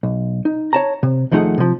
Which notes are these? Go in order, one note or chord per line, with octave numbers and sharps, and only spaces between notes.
B1
D#4
C#5 A5 A#5
C3
D#2 F3 A3 D#4 G#4 F#5
C3 F3